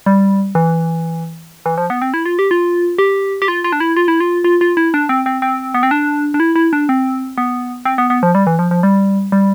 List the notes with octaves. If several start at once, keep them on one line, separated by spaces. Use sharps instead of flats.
G3
E3
E3
F3
B3
C4
E4
F4
G4
F4
G4
G4
F4
F4
D4
E4
F4
E4
F4
F4
F4
E4
D4
C4
C4
C4
B3
C4
D4
D4
E4
E4
D4
C4
B3
C4
B3
B3
F3
G3
E3
F3
F3
G3
G3